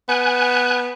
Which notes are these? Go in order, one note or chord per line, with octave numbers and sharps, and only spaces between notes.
B3 G#5 F#6